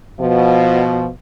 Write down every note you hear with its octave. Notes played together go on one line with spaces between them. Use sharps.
B2 F3